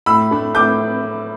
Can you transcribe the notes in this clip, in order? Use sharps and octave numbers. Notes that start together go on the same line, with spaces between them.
A2 B5 E6
A3 D4
A2 D6 G6